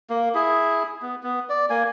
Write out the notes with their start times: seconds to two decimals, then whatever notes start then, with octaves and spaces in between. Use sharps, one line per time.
0.10 A#3
0.35 E4 G#4
1.02 B3
1.23 B3
1.49 D5
1.70 A#3 G#5